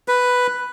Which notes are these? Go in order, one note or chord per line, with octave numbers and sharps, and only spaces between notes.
B4